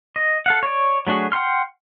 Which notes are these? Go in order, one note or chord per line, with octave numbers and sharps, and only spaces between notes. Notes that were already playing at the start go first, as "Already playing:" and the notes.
D#5
A4 F5 F#5
C#5 D5
F#3 A3 D4 F#4 G#4
F#5 G5 C6 F6